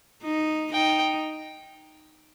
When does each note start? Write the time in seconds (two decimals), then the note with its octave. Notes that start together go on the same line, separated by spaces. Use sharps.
0.23 D#4
0.72 D#4 G5